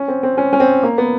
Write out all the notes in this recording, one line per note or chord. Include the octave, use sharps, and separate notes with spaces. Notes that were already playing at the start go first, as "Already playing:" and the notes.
Already playing: C#4
C4
C4
C#4
C#4
C4
A#3
B3